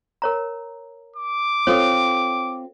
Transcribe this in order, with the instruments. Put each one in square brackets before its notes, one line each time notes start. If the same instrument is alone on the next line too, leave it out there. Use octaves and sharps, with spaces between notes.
[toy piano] A#4 C#5 A#5
[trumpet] D6
[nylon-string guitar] C4 F4 [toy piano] A4 C#5